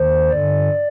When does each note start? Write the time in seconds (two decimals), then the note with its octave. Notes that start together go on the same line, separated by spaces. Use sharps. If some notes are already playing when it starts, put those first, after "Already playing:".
Already playing: D#2 D#3 C5
0.30 G2 D3 D5